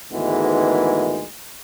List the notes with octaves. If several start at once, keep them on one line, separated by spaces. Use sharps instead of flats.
D2 G#2 D#3 E3 G#3 B3